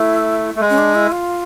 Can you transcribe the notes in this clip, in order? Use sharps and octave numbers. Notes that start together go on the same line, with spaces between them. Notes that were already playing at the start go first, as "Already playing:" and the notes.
Already playing: A3 E4
A3
G#3
C#4
D4
E4
F4